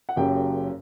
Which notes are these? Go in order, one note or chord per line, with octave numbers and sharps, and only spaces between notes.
F#5
F#1 F#2 C#3 G4 G5